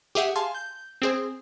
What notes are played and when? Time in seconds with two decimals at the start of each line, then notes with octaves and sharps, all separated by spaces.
0.15 G4 G#4 E5 F#5
0.36 F5 G#5 A5 C6
0.54 G6
1.02 C4 G#4 C5